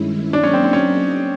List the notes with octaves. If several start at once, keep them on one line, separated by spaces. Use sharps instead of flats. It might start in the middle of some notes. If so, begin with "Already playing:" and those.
Already playing: G2 D#3 G#3 C#4 E4
F#3 A#3 D4 D#4 G#4
C#4
C4
C4
C#4